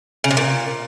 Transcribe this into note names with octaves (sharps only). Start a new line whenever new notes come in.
C#3
C3
A#2